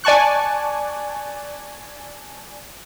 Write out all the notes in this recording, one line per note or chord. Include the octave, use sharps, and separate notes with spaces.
D5 G#5 A5 C#6 F#6